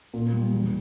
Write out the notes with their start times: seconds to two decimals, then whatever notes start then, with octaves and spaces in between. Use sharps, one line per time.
0.14 A#2
0.33 G3
0.54 E1